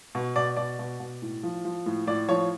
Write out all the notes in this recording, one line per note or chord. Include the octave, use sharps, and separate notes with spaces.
B2
B2 D5
B2 D5
B2
B2
A2
F3
F3
A2
A2 D5
F3 C#5